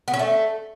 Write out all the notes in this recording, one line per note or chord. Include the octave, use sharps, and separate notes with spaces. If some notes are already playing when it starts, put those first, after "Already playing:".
B3
C#4
A3